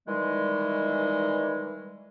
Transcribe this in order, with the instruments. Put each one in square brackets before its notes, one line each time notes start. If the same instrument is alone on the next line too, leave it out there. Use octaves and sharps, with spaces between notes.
[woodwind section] D#3 E3 G3 G#3